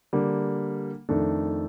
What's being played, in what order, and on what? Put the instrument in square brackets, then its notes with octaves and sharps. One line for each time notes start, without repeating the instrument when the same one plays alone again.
[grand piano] D3 G3 A#3
F2 D#3 A3 D4 A4